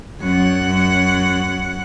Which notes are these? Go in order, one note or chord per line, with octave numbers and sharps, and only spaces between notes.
F#2 F#5